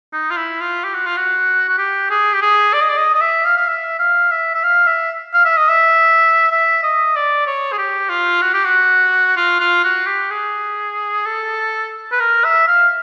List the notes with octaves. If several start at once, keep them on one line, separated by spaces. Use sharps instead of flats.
D#4
F4
E4
F4
G4
F#4
F4
F#4
F#4
G4
G#4
G4
G#4
D5
D#5
D5
D#5
D#5
E5
F5
F5
E5
F5
E5
E5
F5
E5
F5
E5
D#5
E5
E5
D#5
D5
C#5
G#4
G4
F4
F#4
G4
F#4
F4
F4
F#4
G4
G#4
A4
B4
A#4
E5
F5